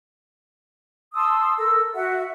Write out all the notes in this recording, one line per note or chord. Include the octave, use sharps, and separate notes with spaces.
A5 C6 D#6 E6
A4 A#4 E6
F#4 E5 F#5